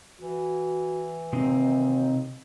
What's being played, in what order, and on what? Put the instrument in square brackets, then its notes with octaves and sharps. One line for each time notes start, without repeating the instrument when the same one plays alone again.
[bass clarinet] E3 [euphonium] F#4
[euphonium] D#2 [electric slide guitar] C3 C4 D#4